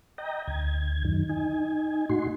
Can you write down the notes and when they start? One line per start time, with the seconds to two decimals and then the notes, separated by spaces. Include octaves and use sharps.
0.18 D#5 G5 A#5
0.48 D2 G#6
1.05 F#2 D#3
1.29 D#4 G#5
2.09 A2 D#4 F#4 C6